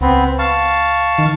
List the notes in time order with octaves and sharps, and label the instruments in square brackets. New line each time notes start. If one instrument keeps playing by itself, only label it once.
[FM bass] C#2 [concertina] B3 C4
[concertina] F5 A5 C#6
[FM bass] D#3